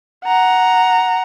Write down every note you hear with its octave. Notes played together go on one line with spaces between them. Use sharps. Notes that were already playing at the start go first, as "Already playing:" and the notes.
F#5 A#5